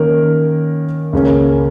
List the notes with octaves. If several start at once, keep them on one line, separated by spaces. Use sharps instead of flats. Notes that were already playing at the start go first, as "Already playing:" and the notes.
Already playing: D#3 A#3 C#4 A#4
C#2 C#3 A#3 C#4